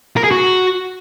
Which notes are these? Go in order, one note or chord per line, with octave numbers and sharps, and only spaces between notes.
A#4
G#4
F#4